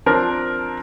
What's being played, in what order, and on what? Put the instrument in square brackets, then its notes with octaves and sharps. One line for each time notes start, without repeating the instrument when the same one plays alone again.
[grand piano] F3 C4 D4 A#4